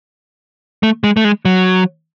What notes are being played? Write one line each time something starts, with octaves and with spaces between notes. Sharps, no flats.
A3
G#3
A3
G#3
F#3